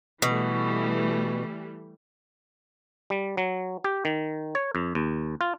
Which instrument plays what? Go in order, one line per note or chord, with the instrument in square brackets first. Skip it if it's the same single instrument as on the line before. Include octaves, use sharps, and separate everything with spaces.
[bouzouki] B2 [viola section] E3 G3 A3
[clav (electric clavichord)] G3
F#3
G4
D#3
C#5
F2
D#2
F4